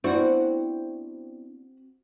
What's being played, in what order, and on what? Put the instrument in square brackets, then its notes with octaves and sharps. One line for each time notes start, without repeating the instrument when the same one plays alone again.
[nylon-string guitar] B3 D4 E4 [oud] C4 F#4